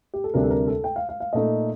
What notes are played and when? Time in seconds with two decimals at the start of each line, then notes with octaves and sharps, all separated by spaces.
0.14 G4
0.24 A4
0.34 D2 C3 G3 D4 A#4
0.44 A4
0.50 A#4
0.67 A4
0.84 G5
0.96 F5
1.09 F5
1.20 F5
1.33 A#2 A3 D#4 D#5